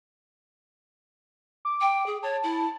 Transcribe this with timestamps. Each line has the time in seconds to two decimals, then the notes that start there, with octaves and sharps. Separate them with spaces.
1.65 D6
1.81 G5
2.06 G#4
2.23 C#5 A5
2.43 E4